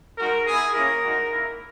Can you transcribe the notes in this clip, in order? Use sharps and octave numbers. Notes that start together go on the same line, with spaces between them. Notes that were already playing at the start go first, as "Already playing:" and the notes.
G#3 D#4 F#4 A#4
B3 E4 G#4
A#3 C#4 E4 A#4
G#3 D#4 F#4
A#3 E4